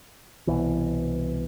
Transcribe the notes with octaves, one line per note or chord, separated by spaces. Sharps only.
C2 B2 E3